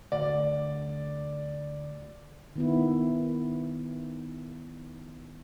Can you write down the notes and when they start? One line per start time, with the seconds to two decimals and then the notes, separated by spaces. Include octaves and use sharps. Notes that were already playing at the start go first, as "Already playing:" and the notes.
0.12 D2 D5
2.56 D#3 B3 E4